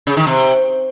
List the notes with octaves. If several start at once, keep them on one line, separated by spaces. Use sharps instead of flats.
C#3
D#3
C3